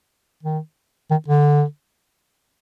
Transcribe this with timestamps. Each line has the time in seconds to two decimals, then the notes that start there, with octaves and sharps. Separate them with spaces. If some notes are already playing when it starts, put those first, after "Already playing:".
0.43 D#3
1.11 D#3
1.28 D3